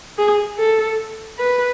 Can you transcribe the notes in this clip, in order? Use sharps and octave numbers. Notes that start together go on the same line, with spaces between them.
G#4
A4
B4